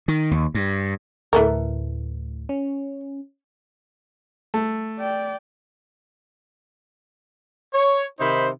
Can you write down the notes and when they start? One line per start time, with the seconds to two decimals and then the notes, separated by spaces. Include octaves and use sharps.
0.08 D#3
0.31 D#2
0.55 G2
1.33 D2 A2 E3 A4 A#4
2.49 C#4
4.54 A3
4.99 D5 G5
7.74 C#5
8.20 C3 D#3 D#4 C5 B5